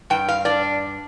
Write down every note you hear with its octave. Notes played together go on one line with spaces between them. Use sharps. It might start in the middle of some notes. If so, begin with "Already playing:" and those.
G2 G5
F5
D4 D5